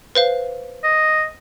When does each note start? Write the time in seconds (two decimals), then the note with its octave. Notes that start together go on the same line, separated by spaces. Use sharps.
0.15 B4 C5 F5
0.84 D#5